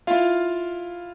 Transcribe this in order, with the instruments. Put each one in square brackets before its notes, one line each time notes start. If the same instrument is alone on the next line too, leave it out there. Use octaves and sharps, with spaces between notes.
[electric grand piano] E4 F4 F5